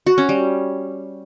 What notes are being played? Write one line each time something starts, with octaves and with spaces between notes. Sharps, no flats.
F#4
C#4
G3